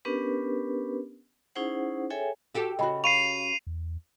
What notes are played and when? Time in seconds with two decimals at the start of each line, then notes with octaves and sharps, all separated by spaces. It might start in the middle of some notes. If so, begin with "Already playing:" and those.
0.05 B3 C#4 D4 G4 A#4 B4
1.55 C#4 D#4 E4 G#4 C5 F#5
2.10 G#4 A4 C#5 E5 G5 G#5
2.55 F#4 G4 A4
2.79 C#3 F#4 D#5 G5 B5
3.04 F5 B5 C#6 C7 D#7 F7
3.67 E2